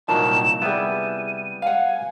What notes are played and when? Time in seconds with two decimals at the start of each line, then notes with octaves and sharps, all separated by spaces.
0.09 C2 A#2 D#3 F#3 A5 E7
0.62 G3 B3 E4 G#4 D#7
1.62 F5 F#5 G#5